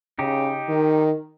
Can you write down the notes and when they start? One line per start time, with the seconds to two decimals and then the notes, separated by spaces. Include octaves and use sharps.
0.19 C#3 D#4 G4
0.68 D#3